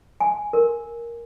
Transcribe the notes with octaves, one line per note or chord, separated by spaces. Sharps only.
G#5
A#4